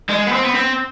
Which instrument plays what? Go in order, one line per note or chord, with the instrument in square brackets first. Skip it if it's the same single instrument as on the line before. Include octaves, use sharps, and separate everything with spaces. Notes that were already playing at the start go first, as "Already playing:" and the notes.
[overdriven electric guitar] G#3
B3
C4
B3
C4